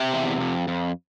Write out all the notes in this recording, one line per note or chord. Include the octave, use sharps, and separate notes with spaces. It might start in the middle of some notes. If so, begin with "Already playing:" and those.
Already playing: C3 E5 G5
E2
F2
F2